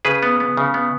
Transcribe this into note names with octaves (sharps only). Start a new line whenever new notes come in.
C#3 G#4 B4
B3
B3
C#3
B3